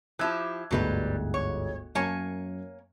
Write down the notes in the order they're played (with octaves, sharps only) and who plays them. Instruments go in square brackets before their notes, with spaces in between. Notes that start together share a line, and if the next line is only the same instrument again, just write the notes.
[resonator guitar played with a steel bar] F3 E4 G4 [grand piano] E6 F#6 G#6
[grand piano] G1 D2 G#2 [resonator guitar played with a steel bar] F#3 G3 B4
[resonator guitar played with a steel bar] C#5
[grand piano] F#2 [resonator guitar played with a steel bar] A#3 C#5 G#5